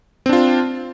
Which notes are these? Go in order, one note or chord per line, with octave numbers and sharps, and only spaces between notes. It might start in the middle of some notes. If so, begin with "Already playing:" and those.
C4 D4 F4